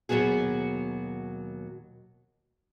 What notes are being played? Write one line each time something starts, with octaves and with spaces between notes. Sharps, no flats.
D#2 B2 F#3 B3 F#4 G#4